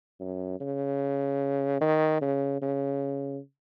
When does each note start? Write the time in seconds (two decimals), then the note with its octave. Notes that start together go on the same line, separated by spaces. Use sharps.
0.20 F#2
0.60 C#3
1.81 D#3
2.21 C#3
2.62 C#3